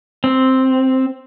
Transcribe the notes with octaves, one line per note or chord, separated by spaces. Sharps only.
C4